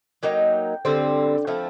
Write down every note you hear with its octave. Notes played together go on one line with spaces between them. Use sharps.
F#3 A#3 D#4 G5
D3 G3 C4
F3 A3 C4 E4